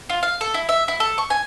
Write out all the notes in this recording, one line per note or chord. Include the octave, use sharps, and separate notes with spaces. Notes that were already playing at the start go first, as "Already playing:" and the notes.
F4
F5
A4
E4
E5
E4
A4
C#6
G#5